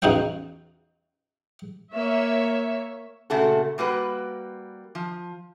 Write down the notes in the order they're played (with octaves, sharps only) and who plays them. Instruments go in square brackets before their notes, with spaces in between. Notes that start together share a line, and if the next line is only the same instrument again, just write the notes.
[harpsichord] E2 C#3 D#4 F#4 F5 G5
[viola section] A#3 C#5 E5
[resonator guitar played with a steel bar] A#2 C#3 A3 F#4 A4
G3 A#3 F#4 B4
F3